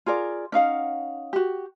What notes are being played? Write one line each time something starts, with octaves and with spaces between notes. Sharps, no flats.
F4 G#4 A#4 D5
C#4 D#4 F5 F#5
F#4 G4